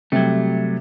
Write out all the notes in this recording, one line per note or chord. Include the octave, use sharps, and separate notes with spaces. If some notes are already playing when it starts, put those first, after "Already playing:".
C3 F#3 G3 A3